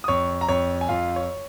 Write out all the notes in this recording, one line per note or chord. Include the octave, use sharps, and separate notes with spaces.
D#6
F2 C#5 C#6
A#5
F2 C#5 C#6
G#5
F2 F4 F5
C#5